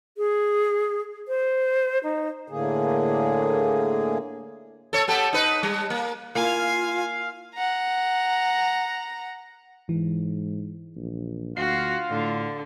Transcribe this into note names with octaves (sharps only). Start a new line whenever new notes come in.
G#4
C5
D#4
A2 D3 A#3 G#4
A4 C#5
B3 G4 A4
D#4 B4
G3
A#3
A#3 E4 F4 F5 G#5
F#5 A#5
G#2 E3
A#1
D2 F4 F#4 F5 C7
A2 D3